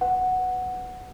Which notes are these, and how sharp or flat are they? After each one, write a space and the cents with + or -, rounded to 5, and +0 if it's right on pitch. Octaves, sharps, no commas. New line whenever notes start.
B4 +15 F#5 +0